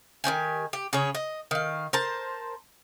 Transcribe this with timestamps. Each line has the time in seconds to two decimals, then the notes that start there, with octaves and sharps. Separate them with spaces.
0.24 D#3 C#4 G4 G#5
0.73 G4
0.93 C#3 G#4 C#5
1.15 D#5
1.51 D#3 F5
1.93 A#4 C5 A5